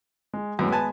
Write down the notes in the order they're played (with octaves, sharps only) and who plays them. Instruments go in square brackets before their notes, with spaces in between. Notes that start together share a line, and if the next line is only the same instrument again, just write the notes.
[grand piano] G#3
[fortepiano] F#2 A2 [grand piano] G#3 B3
[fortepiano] B4 G#5 A5